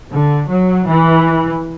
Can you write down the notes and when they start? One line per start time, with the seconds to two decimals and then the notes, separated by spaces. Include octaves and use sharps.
0.11 D3
0.49 F#3
0.87 E3